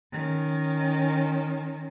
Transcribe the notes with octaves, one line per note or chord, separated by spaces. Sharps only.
D#3 C#4